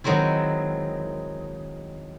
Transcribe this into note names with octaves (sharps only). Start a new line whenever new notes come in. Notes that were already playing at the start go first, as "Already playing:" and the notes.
D#3 F#3 G#3 C4 E4